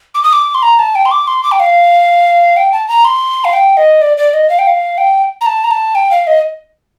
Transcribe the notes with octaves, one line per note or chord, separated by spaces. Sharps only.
D6
D#6
D6
C6
A#5
A5
G5
C6
D6
C6
D6
G5
F5
G5
A5
A#5
C6
F5
G5
D#5
D5
D5
D#5
F5
G5
F5
G5
A#5
A5
A#5
A5
G5
F5
D#5